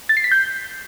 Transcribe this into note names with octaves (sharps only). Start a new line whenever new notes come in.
A6
C7
B6
G6